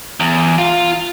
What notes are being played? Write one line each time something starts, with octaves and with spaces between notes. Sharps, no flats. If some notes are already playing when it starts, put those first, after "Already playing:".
E2
F4